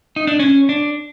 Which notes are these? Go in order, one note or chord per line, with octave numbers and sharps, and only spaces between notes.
D#4
D4
C#4
D4